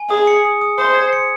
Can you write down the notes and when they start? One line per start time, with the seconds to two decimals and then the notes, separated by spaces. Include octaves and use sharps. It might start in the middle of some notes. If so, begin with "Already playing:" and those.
Already playing: G#5
0.10 G#4 D#6
0.27 C#7
0.45 D#6
0.61 D#6
0.78 C5 D#6
0.95 G#6
1.13 C#7